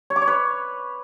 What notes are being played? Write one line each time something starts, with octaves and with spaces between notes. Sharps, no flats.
C#5
D6
C#5
B4